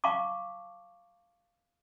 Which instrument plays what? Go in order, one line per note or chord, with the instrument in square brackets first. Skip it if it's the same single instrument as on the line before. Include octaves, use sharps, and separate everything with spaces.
[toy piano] F5 A5 C#6 D6